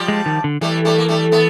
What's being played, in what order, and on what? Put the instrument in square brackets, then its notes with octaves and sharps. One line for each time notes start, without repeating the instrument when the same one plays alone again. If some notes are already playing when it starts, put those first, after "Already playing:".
Already playing: [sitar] F3 G3
[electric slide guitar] G#3
D#3
D3
[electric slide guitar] E3 [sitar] G3 A3
[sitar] G3 A3
A#3
G3 A3
A3 B3